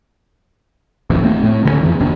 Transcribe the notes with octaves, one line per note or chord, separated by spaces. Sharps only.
D#1 A1 F2 E3
A3 C4
A2 A3
D2 D3 G#3 C#4
F2 G#2 E3
G1 D#2 C3 D4